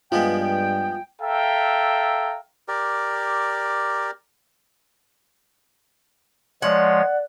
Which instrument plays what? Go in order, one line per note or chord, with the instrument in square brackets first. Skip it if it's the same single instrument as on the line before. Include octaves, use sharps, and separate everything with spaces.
[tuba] G2 [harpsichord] F3 G#3 B3 [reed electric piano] F4 [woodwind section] G5
[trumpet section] A4 E5 F5 G5 A#5
[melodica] G4 A#4 D5
[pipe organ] F3 G#3 C#5 [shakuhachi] D5 [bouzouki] F#5